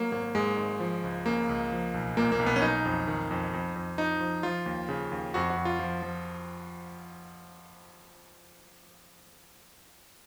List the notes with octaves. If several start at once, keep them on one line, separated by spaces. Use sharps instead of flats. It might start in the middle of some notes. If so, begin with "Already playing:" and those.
Already playing: F#3 A#3
G#1 A#3
G#2 G#3
G#1
F3
C#2
C#3 A#3
C#2
F3
B1
A#2 A#3
A#3
B1
B3
C#4
F#3 D#4
F2
D#3
F2
F2
F2
F3 D#4
F3
F3 F4
D#2
C#3
D#2
F2 F#4
F#4
F2
F4
F3
F3